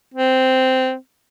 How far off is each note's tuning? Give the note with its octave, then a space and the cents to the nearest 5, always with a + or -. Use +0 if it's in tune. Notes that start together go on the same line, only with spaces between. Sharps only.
C4 -10